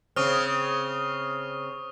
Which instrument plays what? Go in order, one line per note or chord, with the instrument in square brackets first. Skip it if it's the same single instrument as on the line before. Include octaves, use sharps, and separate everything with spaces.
[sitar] C#3 C4 [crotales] C#6 D#6 F6